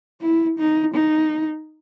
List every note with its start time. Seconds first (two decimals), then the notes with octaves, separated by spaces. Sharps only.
0.22 E4
0.59 D#4
0.94 D#4